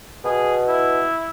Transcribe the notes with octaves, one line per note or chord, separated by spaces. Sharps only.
B2 G#4
E4